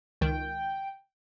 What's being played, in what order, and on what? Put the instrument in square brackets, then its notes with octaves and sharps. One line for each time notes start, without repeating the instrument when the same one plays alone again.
[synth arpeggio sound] C#2 D#3 [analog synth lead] G5